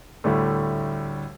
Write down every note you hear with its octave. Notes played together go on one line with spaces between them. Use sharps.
D2 A2 G3 A3